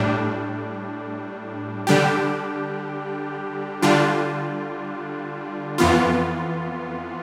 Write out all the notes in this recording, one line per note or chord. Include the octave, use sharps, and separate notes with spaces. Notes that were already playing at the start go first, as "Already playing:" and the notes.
Already playing: A2 G3 D4
D3 G3 D4 G4
D3 G3 D4 F4
F2 E3 B3 F4